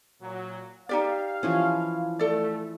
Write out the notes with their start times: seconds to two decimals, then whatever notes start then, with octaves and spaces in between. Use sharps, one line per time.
0.22 A#2 F#3
0.89 D#4 G4 D5 F5
1.43 E3 F3 C#4
2.19 A3 A4 D5